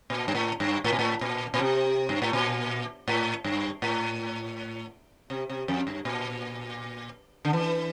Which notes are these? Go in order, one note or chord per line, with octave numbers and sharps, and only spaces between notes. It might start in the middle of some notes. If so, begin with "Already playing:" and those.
A#2
G2
A2
G2
A2
A#2
A2
A#2
A#2
C3
G2
A2
A#2
A2
G2
A2
C3
C3
F2
G2
A#2
D3
E3